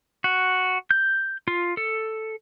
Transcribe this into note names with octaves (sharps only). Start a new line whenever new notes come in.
F#4
G6
F4
A4